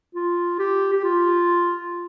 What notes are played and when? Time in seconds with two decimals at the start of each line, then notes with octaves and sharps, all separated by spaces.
0.15 F4
0.59 G4
0.93 G4
1.04 F4